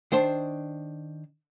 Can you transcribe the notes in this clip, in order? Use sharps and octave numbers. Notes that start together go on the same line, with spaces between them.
D#3 D4 C5 A5 C6